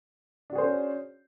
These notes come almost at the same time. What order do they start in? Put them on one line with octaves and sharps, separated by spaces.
D4 F#4 G#4 C5 C#4